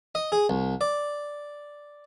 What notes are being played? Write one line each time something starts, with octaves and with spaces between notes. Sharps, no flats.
D#5
G#4
C2
D5